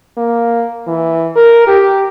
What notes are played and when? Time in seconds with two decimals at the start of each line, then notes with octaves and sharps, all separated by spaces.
0.17 A#3
0.87 E3
1.36 A#4
1.67 G4